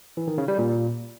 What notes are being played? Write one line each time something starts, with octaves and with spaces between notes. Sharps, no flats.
E3
D#3
C#3
G3
A#2